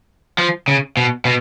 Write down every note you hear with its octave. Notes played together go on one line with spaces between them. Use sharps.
F3
C#3
B2
B2